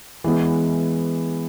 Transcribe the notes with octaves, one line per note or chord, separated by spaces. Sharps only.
E3 G#3 B3